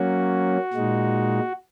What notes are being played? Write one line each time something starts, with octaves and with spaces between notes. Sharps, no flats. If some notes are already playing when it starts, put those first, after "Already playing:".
Already playing: F#3 A#3 C#4 F#4
A#2 G#3 D#4